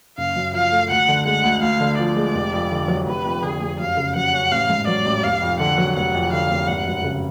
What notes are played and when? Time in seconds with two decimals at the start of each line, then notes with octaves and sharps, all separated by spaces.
0.18 F#1 F5
0.36 F#2
0.53 F3 F5
0.71 A3
0.90 D2 F#5
1.08 D3
1.26 G#3 F#5
1.44 D2
1.62 D2 F5
1.80 D3
1.98 F3 D5
2.16 G#3
2.35 F1
2.53 F2
2.71 D3
2.88 F#3
3.07 F1 B4
3.25 F2
3.43 D3 G#4
3.61 F1
3.80 F#2 F5
3.97 C#3
4.16 F#3 F#5
4.34 C#4
4.51 A1 F5
4.70 G#2
4.87 F#3 D5
5.05 A1
5.23 F1 F5
5.42 F2
5.60 D3 F#5
5.78 F#3
5.96 F1 F#5
6.15 F2
6.32 D3 F5
6.51 F1
6.68 G#1 F#5
6.87 F#2
7.04 C#3